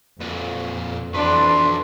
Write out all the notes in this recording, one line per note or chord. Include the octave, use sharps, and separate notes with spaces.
F2 A#2 B4
F2 E3 F#3 D4 B4 C6